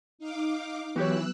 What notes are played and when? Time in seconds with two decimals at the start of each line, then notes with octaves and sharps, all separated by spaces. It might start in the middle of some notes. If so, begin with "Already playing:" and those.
0.19 D#4 F5 D6
0.96 E3 F#3 B3 F#4 G4 C#5 E6 F#6